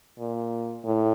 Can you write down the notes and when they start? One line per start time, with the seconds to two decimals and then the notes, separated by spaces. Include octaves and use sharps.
0.18 A#2
0.84 A2